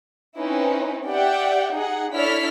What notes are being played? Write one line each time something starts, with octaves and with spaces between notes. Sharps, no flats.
C4 C#4 D#4 E4 B4
G4 D5 E5 F#5 G5
D#4 G#4 F#5
D4 E4 A4 C#5 F6 B6